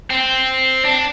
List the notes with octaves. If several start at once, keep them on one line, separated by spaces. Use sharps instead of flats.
C4
D4